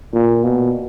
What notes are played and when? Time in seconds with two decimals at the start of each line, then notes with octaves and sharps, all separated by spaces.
0.13 A#2
0.44 B2